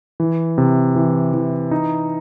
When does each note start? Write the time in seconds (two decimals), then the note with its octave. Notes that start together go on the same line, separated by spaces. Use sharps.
0.20 E3
0.58 C3
0.96 E3
1.34 E3
1.71 D#4